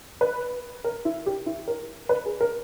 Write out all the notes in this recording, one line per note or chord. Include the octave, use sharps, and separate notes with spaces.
B4
A#4
E4
G4
E4
A#4
B4
G#4
A#4